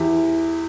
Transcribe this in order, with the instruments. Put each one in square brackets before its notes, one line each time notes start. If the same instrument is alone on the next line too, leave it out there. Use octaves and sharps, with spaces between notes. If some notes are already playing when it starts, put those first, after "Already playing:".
Already playing: [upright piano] E2 E4 G4